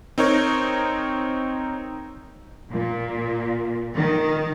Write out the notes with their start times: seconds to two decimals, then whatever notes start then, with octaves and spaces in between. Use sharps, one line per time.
0.18 C4 D#4 A#4 C#5
2.72 A#2
3.96 D#3